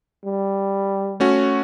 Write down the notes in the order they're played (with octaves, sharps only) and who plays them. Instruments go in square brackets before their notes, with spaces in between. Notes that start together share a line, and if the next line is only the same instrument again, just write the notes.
[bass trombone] G3
[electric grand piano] A3 C#4 F#4